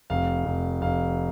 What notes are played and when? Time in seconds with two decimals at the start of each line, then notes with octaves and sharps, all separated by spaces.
0.10 F1 F5
0.45 F1
0.81 F1 F5